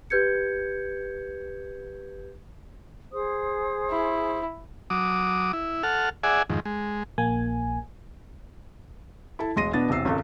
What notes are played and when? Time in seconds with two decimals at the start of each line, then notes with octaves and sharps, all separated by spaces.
0.10 G4 B4 G6 G#6 C#7
3.12 G#4 C5 D#6
3.90 E4
4.90 F#3 D6 D#6
5.53 E4
5.83 A4 F#5 F6
6.23 G#4 D5 E5 F#5 G#5
6.50 F2 G#2 D#3
6.65 G#3
7.18 A#1 A#3 G#5
9.39 E4 A4 A5
9.56 E1 G#3 C6 A#6 D#7
9.73 B2 B3 D4 A6
9.89 E1 C2 C3 E6 C7
10.05 G#1 C#2 A4